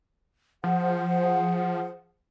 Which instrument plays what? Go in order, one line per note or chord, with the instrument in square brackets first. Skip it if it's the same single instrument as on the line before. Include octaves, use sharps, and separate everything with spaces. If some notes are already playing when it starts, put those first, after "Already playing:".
[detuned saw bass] F3 [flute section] G#4 C5 F#5